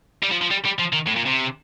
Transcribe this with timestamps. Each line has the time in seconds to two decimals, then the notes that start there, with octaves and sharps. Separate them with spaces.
0.23 G3
0.31 F3
0.41 F3
0.50 G3
0.65 G3
0.79 F3
0.93 D#3
1.07 A2
1.17 A#2
1.26 C3